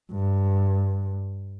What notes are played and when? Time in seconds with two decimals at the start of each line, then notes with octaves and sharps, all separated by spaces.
0.11 G2